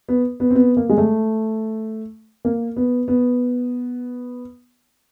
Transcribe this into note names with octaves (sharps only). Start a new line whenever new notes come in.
B3
B3
C4
B3
A#3
G#3
A3
A#3
B3
B3